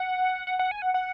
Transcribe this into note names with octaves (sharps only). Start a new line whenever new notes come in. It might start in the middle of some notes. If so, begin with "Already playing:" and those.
Already playing: F#5
F#5
F#5
G#5
F#5
F#5